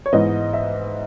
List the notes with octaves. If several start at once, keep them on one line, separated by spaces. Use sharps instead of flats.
C#5
G#2 E3 B3 D#5
E5